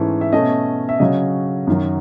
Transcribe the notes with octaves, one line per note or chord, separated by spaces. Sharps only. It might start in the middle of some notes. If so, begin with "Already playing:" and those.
Already playing: G#2 E3 A3 C#4
E5
B2 A3 C#4 D#5
E5
C#3 F#3 C#4 D#5
F#2 D#3 F#3